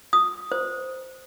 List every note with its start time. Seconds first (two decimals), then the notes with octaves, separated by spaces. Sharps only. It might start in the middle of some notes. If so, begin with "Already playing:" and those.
0.13 D#6
0.52 C5